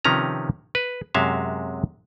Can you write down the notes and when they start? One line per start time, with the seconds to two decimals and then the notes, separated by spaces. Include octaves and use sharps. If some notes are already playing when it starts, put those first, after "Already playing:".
0.05 C3 D#3 F3 C#4 B4 A#5
0.75 B4
1.14 F#2 C3 G#3 F#4 E5 F5